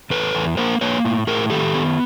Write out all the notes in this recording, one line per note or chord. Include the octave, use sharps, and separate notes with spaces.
E2 A4 B4
E2
A#3 A#4 C5
A#3 B4 C#5
A2
A2 G#4 A#4
D#3 G4 A4
B3